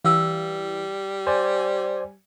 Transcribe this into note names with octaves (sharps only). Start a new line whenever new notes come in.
E3 G3 F5 E6
C5 D5 G#5